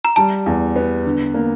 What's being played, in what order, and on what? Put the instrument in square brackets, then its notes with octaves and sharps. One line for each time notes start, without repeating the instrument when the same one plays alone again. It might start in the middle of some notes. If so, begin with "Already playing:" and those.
[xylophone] A#5
[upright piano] G3 [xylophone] A5
[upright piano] E2
B3
D3
A#3